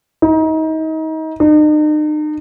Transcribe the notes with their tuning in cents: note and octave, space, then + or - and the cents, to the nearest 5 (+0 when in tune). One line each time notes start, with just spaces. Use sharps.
D#4 +30
D#4 -40